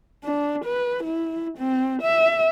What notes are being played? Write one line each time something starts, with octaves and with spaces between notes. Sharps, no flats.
D4
B4
E4
C4
E5